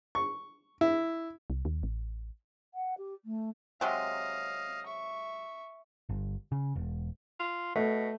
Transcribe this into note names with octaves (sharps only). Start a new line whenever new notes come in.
C#6
E4
C2
D#2
A1
F#5
G4
A3
C3 F#3 G#3 D#5 F5
E5 C#6
G1
C#3
E1
F4
B2 A3